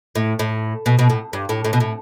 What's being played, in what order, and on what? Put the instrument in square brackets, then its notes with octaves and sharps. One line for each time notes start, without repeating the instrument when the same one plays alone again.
[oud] A2
A2
B2
B2
A2
G2
A2
A2
B2
A2